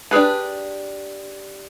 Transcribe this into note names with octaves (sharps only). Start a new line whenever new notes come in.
D4 G4 G#4 B4